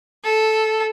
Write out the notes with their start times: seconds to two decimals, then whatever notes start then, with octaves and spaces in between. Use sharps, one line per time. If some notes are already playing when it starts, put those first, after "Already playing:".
0.25 A4